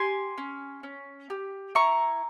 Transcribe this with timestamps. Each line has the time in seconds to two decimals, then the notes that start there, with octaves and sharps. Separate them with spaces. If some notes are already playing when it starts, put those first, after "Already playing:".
Already playing: G4 G#5 C6
0.38 C#4
0.83 C#4
1.30 G4
1.75 E4 A#5 C#6